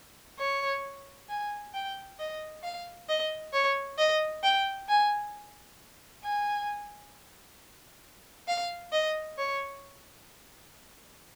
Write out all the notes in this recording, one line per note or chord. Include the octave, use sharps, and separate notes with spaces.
C#5
G#5
G5
D#5
F5
D#5
C#5
D#5
G5
G#5
G#5
F5
D#5
C#5